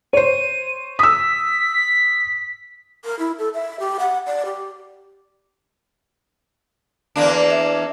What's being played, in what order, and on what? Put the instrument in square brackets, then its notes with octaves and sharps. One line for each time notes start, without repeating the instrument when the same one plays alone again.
[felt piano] C5 C#5 [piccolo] D#7
[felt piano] D#6 E6 [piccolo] B6
[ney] A#4
E4
A4
E5
G4
F#5
D5
G4
[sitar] E2 A#3 D4 [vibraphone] D5
[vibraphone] E5